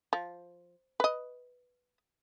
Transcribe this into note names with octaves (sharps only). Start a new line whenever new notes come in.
F3
B4 D#5